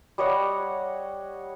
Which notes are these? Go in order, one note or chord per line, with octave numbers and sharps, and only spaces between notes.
G3 C#5 D#5 F#5